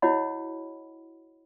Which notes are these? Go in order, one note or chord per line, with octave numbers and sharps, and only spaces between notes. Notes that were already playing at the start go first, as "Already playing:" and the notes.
E4 F#4 C#5 D#5 F#5 B5